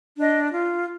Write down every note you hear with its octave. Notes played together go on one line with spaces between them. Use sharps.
D4 D#5
F4